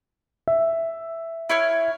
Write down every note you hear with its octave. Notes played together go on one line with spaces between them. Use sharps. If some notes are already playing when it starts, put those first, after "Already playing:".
E5
E4 C#5 F6